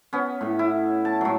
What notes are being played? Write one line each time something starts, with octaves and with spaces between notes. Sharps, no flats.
B3 C#4
A2
E4
A5
A2 F#3